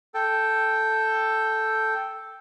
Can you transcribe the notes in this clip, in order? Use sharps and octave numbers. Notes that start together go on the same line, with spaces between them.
A4 G5